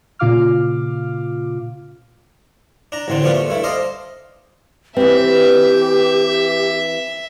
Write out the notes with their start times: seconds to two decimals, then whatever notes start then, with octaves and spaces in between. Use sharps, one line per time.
0.19 A#2 C#3 F4 F5 D6 F6
2.92 D4 A#5
3.08 A1 A2 D3 C4
3.22 A#2 F3 G3 B3 D4 F4
3.34 A3
3.49 G2 A3 E4
3.64 A4 C5 D5 D#5 F5
4.97 E3 C4 G4 B4 E5